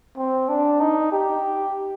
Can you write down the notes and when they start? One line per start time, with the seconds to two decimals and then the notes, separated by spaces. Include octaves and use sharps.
0.17 C4
0.49 D4
0.80 D#4
1.12 G4